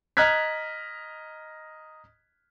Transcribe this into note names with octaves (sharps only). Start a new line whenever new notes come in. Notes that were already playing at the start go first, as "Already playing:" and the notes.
D#5 A#5 F6 F#6 G#6 B6